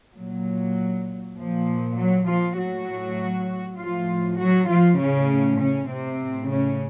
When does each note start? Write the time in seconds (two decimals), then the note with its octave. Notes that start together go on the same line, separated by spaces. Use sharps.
0.15 A#2 F#3
1.36 A#2 F3
1.96 F#3
2.26 F3 F4
2.57 A2 F#3 F#4
3.78 A2 F3 F4
4.38 F#3 F#4
4.68 F3 F4
4.99 A2 C#3 C#4
5.59 C#3 C#4
5.89 C3 C4
6.20 A2
6.49 C#3 C#4